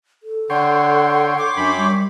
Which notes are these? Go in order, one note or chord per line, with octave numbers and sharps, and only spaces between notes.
A4
D3 C#5 F#5 G5 C6
D6
F#2 D4 B5
G3